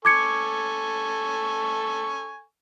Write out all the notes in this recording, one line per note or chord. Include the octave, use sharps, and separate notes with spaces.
A4 G#5 C#6 D6 G#6 C#7